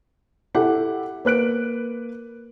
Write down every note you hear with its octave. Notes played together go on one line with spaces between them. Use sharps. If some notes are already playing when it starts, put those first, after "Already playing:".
E4 G4 A4 F#5
A#3 B4 F#6 D7